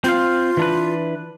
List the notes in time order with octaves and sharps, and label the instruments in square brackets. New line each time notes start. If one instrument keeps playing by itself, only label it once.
[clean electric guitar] C4 C5 F5 [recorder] F4
[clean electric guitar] E3 D4 B4